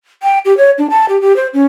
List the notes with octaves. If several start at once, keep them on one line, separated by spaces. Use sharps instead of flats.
G5
G4
C#5
D4
A5
G4
G4
C5
C#4